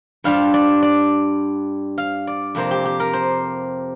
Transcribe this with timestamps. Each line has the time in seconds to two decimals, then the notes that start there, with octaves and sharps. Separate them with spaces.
0.24 G2 G3 D4 F4 F5
0.54 D5
0.82 D5
1.98 F5
2.27 D5
2.55 F2 C3 A#3 C5
2.71 G4
2.85 G4
3.00 A#4
3.13 C5